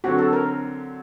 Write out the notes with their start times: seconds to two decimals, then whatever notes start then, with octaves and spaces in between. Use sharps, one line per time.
0.04 D3 F#3 C4 F#4
0.19 A4
0.33 A#4